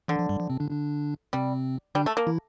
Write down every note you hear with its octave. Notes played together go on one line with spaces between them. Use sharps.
D3 E3
F3
G2 G3
F3
C3 C4
D3 D4
D3 D4
C3 G3 C4
D3 G3 D4
A3
A#3
E3 E4